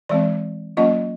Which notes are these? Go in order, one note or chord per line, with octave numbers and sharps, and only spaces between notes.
E3 G#3 C4 D5
F#3 A#3 C#4 F4 D#5